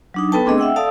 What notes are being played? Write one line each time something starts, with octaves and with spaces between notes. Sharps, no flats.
F#3 D4 D#4
B3 A4 B4 G5 A5
A3 C4 D4 G#4 D#5
E5 F#5 G5 E6
A4 D5 F5 A5 D#6 E6